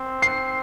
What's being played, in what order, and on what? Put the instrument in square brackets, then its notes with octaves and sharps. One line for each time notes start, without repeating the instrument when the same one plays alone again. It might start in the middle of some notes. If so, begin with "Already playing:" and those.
Already playing: [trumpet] C4
[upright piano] C7